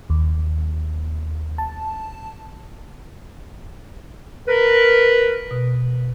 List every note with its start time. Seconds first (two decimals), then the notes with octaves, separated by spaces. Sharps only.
0.10 D#2
1.58 A5
4.48 A#4 B4
5.51 B2